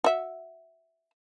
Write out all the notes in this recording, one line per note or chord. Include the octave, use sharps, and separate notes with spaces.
F#4 E5